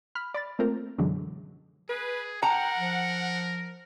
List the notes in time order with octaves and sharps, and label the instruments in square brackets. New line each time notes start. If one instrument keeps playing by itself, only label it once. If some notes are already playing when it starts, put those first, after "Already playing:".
[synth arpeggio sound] B5 F6
D5 B5 A6
A3 A#3 C4 F4 A#4 C5
F#2 B2 D3 E3 F#3 G#3
[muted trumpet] G#4 [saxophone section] B4
[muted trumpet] A#4 [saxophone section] F#5 [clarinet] G5 [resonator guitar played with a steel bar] A#5
[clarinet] F3